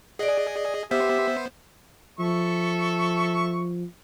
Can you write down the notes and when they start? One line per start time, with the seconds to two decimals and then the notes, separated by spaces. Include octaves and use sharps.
0.19 G#4 D5 D#5 F#5
0.91 B3 G4 C5 E5 F5
2.20 F3 A4 E5 C#6